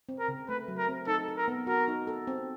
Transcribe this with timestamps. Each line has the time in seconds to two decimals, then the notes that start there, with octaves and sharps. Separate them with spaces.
0.09 C4
0.19 A#4
0.28 C#3
0.48 A3 B4
0.68 F#3
0.78 A#4
0.89 C4
1.07 D#4 A4
1.28 A4
1.37 A#4
1.48 B3
1.67 F#4 A#4
1.88 D#4
2.07 A4
2.27 C4